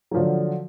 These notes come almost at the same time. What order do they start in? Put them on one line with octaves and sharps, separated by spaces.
F#3 F3 D3